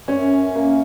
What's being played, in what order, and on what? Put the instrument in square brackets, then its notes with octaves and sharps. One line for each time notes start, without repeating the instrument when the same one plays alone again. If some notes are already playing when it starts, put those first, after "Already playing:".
[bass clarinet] F#2 [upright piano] C#4
[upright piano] A#3